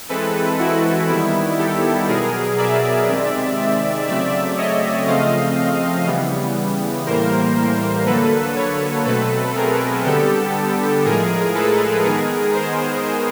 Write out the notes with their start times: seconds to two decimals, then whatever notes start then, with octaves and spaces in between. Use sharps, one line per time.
0.09 E3 G#3 C4 A4 B4
0.59 E4 F#4
1.09 D#3 G3 B3 E4
1.58 G4 A4
2.08 B2 F#3 B3 G#4 A#4
2.58 D5 E5
3.08 C3 D#3 G#3 C4
4.08 C#3 F#3 A3 C4 D5 E5
4.57 C#5 D#5
5.07 C#3 F3 A3 C4 D#5 F5
6.07 C#3 E3 G3 B3
7.06 A2 E3 G3 A#3 A#4 C5
8.06 D3 F#3 A#3 A4 B4
8.56 B4 C#5
9.06 B2 F#3 A3 C4 A4 B4
9.56 G#4 A#4
10.05 D3 G3 B3 G4 A4
11.05 A2 F3 G#3 G#4 A#4
11.55 A4 B4
12.05 D#3 G#3 B3 G#4 A#4
12.54 A#4 C5